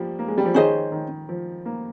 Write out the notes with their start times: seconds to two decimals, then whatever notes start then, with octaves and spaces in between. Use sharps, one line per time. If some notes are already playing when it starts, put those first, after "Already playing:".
Already playing: F3 G3 A#3
0.19 A#3
0.28 G#3
0.38 G3
0.45 F3
0.54 D#3 C#4 G#4 C5 D#5
0.92 D#3
1.29 F3
1.66 A#3